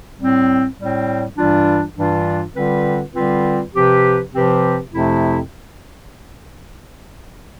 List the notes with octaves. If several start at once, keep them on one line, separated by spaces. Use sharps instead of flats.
A2 G3 C4
A2 G3 C4
G2 E3 G3 D4 F4
G2 E3 G3 D4 F4
D3 G3 C4 F4 B4
D3 G3 C4 F4 B4
C3 F3 C4 G4 B4
C3 F3 C4 G4 B4
F2 C3 F3 A3 E4